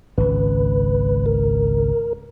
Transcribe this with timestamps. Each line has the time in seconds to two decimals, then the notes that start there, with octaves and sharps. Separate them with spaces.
0.18 G#1 C#2 B4
1.26 A#4